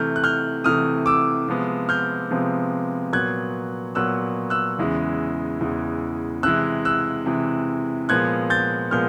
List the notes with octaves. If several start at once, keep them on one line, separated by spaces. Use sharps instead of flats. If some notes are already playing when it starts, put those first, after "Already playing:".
Already playing: C3 E3 A3 F6 G6
F#6
F6 G6
C3 E3 A3 D#6 F6
D6 E6
C3 F3 G#3 B3
F6 G6
C3 F3 G#3 B3
A#2 F#3 B3 F#6 G#6
A#2 F#3 B3 E6 F#6
E6 F#6
E2 C#3 E3 G#3
E2 C#3 E3 G#3
C3 E3 G#3 E6 F#6
E6 F#6
C3 E3 G#3
A#2 F3 G#3 B3 F#6 G#6
G6 A6
A#2 F3 G#3 B3 F6 G6